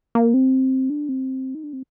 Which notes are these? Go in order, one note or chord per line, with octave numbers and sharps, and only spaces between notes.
A#3
C4
D4
C4
D#4
D4
C4